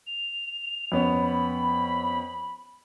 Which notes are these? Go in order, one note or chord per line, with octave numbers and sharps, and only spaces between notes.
F7
F2 B3 C#4
B5